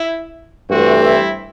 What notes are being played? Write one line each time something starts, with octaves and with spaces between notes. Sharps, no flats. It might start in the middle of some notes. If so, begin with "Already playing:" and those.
Already playing: E4
G2 E3 A3 C4 F#4
E4